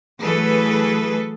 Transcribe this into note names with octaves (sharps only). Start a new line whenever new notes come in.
E3 F#3 A3 G#4 A4 B4